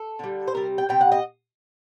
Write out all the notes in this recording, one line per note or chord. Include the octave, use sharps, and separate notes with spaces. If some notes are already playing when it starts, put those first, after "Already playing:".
Already playing: A4
D3 G3
C5
C3 G3 A#4
G5
C3 G3 G5
F#5
D#5